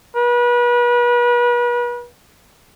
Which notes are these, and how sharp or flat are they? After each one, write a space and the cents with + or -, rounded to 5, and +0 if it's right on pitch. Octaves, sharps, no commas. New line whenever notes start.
B4 -35